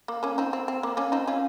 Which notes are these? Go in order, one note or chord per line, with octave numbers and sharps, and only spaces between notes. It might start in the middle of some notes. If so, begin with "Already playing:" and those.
A#3
A#3 C#4
C4 D#4
C4
C4
A#3
A#3 C#4
C4 D#4
C#4 F4